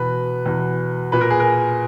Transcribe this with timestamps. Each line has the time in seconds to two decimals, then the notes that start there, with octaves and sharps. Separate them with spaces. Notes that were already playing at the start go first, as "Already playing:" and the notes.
Already playing: E2 B2 B4
0.46 E2 B2
1.12 A#2 B4
1.21 A#4
1.30 G#4
1.40 A#4